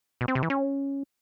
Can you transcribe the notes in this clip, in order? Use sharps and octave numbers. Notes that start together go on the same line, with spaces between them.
B2
C4
C3
E3
C#4